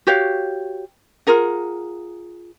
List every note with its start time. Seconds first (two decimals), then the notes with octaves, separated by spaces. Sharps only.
0.07 F#4 G4 C#5 F5
1.27 F4 G#4 A#4 F#5